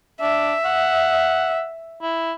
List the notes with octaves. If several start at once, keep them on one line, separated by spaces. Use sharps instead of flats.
D4 E5
F#5
E4